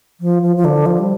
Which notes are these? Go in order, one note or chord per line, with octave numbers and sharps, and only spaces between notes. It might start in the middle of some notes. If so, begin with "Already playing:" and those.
F3
F3
F3
D3
F3
G3